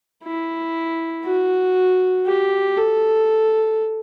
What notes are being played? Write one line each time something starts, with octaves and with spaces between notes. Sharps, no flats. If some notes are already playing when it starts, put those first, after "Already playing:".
E4
F#4
G4
A4